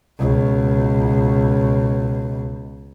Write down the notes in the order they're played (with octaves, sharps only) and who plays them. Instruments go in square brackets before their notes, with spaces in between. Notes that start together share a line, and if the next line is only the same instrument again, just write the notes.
[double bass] C#2 B2